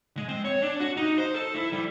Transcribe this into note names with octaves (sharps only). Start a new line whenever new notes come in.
G#3
C4
C#5
D4
F#4
D#4
C5
A4
E4
G3